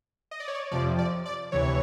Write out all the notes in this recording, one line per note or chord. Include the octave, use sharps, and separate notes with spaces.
D#5
D5
C#5
D5
F2 C3 F3 D5
D5
D5
D2 C3 E3 C#5